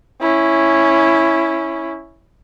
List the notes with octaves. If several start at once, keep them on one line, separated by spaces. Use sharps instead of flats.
C#4 E4